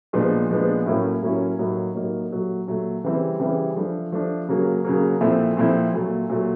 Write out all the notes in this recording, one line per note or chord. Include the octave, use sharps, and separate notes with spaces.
A#2 F3 G#3 B3 D4
A#2 F3 G#3 B3 D4
A2 F#3 A#3 C#4 E4
A2 F#3 A#3 C#4 E4
A2 F#3 A#3 D#4
A2 F#3 A#3 D#4
A#2 F#3 A3
A#2 F#3 A3
C#3 E3 G3 C4 E4
C#3 E3 G3 C4 E4
F3 A3 D4
F3 A3 D4
C#3 F#3 A#3
C#3 F#3 A#3
A#2 F3 A3 C4 E4
A#2 F3 A3 C4 E4
A#2 F#3 A3
A#2 F#3 A3